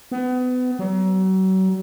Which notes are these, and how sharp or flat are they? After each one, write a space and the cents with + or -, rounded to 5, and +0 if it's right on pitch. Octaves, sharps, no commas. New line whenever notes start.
B3 +30
F#3 +35